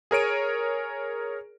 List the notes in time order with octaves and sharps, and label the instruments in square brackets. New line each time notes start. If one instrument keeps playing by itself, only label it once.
[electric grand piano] G#4 A#4 C#5 D7 D#7